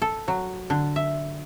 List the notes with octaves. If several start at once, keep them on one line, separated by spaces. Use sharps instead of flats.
A4
F#3
D3
E5